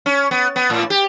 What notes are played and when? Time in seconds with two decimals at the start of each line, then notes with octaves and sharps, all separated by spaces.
0.06 C#4
0.31 B3
0.56 B3
0.70 A2
0.90 G4